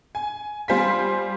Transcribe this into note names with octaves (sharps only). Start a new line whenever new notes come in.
G#5
G3 F4 C5 G#5 B6